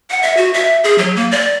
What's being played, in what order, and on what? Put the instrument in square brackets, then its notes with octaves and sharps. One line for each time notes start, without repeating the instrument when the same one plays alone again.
[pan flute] F#5
E5
F#4
E5
G#4
F#3
A#3
D5